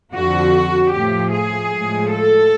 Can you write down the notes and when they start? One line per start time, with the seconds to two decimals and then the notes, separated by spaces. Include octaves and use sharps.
0.13 F2 D3 F3 F#4
0.91 A2 F3 A3 G4
1.31 G#4
1.71 A2 F3 G#3
2.11 A4